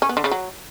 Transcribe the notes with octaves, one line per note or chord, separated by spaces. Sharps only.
C#4
B3
D3
C#3
F#3